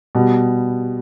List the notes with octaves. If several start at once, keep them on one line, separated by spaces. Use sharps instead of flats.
B2 G3 B3